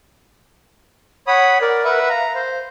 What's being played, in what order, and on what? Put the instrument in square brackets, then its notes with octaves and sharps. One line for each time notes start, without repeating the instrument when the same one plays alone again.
[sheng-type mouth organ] C#5 B5 D#6 [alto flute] F#5
[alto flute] A#4 [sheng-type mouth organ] D5
[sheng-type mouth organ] B4 E5 F#5
[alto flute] F5 [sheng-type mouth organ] A#5
[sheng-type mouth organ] C5